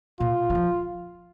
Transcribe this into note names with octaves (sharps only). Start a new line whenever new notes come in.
A#2 F4
G3
F3